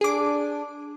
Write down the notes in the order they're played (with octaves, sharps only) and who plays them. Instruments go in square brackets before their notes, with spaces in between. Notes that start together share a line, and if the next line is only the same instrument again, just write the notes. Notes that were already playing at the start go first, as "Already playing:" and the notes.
[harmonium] D4 [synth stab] G#4 D6